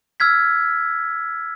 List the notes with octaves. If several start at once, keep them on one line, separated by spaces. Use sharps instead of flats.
E6 F6 G#6 B6